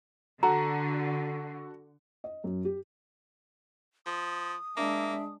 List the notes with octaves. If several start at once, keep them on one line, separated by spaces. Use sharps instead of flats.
D3 F#4 A4 F#5 A#5
D#5
F#2
G4
F3 D#6
G#3 A#3 D4 E5